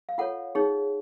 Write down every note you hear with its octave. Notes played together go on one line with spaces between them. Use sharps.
F5
F4 A4 C#5 F#5
D#4 G#4 C#5